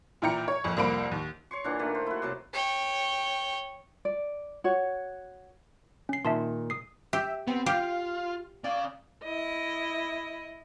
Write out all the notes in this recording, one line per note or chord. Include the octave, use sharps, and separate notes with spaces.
A#2 E3 E4 G5 A#5 C#7
C#5
F#1 F2
C2 F2 A#3 C5 B5 D7
D#2
C#5 C6 C#6
A#2 E3 D4 F#5
D#3 A3 A#3
C5
E4 F#4
C3 F#3 A5
C#5 G5
D5
F#4 C#5
C#4 C7
A#2 D#3 E5 A5 C6
D#6 C7
G4 E5
B3 C4
F4 G4 F5
C#4 D5 F5
E4 D#5